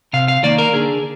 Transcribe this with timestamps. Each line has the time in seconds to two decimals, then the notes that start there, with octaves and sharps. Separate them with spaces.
0.13 C3 F5
0.28 F5
0.43 D#3 A#3 D5
0.58 A#4
0.73 D3 G#4